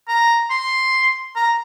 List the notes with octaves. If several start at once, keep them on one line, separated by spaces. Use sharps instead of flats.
A#5
C6
A#5